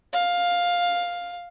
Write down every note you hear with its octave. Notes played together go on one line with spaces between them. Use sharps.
F5